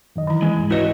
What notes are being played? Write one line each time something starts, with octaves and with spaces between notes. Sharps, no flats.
F#2 D#3 D#5
E3 E4
G#3
C#2 G#2
E4 F#4 B4 C#5 D#5